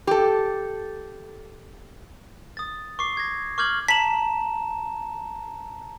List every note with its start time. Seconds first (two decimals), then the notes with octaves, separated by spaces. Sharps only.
0.07 G4 A4
2.57 D#6 A6
2.99 C#6 D6 C7
3.17 G#6 A#6
3.58 C#6 D6 F6 G6 G#6 F#7
3.88 A5 A#5 B6 E7 F#7